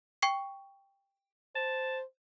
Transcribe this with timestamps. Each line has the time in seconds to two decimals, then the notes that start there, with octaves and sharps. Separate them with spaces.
0.22 G5 C#6 C7
1.55 C5 A5